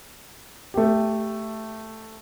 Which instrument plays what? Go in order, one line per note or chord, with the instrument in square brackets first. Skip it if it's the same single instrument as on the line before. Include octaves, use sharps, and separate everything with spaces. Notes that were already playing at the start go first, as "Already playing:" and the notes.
[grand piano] A3 G4